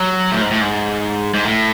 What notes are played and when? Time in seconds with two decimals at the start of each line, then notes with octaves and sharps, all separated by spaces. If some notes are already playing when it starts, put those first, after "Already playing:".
Already playing: F#3
0.32 A2
0.42 G#2
0.51 A2
0.61 G#2
1.34 G#2
1.45 A2